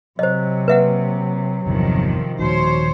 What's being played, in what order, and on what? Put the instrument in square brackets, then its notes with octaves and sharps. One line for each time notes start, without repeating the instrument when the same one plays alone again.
[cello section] C3 [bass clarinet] F#3 [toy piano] C5 D#5
[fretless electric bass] A#3 [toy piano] B4 E5 F#5
[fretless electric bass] G1 E2 [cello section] C3 D#3 F3
[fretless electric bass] D#1 D#3 F3 [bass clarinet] B2 [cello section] C5 C#5